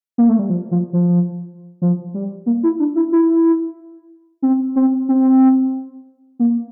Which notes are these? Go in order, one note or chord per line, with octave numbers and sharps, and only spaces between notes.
A#3
A3
G3
F3
F3
F3
F3
G3
A#3
E4
D4
E4
E4
C4
C4
C4
A#3